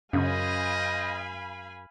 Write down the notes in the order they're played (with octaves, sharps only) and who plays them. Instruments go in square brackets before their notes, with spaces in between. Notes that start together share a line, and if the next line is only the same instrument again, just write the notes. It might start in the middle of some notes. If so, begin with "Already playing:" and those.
[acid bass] F#2 [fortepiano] C#3 [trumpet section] C5 D#5 [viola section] F5 G#5 B5